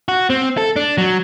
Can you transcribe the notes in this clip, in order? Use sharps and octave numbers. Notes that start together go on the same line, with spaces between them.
F#4
C4
A4
D4
F#3